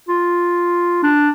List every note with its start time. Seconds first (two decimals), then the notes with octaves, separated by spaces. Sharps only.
0.09 F4
1.03 D4